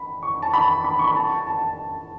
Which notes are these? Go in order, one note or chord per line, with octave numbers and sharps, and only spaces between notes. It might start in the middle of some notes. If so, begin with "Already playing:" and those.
Already playing: B5
C#6
A5
B5
B5
C#6
B5
A5
A5